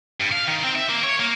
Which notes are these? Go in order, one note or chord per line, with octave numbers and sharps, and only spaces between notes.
G2
F5
D#3
C4
E5
A#3
C#5
A#3